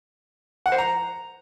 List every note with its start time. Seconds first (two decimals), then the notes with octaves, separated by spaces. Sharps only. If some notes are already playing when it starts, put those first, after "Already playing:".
0.66 F#5
0.72 C5
0.78 A#5